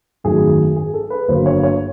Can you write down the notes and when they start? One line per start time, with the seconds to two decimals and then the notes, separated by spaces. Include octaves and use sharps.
0.24 G#1 F#2 D#3 F#3 A3 G#4
0.76 G#4
0.94 A4
1.10 B4
1.28 G1 G2 D3 F#3 A#3 C5
1.46 C#5
1.63 C#5